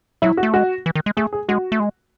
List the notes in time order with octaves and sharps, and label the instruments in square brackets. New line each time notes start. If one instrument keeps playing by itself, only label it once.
[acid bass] F#3 [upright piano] E4
[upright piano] F#4
[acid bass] A3
[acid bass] G#3 [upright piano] F#4
[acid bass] E3
D#3
G#3
[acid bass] A3 [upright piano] G#4
[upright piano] G#4
[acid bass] G#3 [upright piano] F#4
[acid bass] A3
G#3